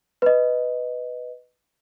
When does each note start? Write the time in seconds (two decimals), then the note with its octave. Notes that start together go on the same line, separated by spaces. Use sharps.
0.22 B4 D#5